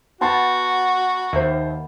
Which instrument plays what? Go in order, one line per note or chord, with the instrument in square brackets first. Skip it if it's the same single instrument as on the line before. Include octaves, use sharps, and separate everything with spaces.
[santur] B3 A5 [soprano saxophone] F#4 [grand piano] G5 C6 A6
[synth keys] D#2 [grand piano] C5 E5